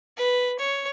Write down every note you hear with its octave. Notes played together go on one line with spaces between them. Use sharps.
B4
C#5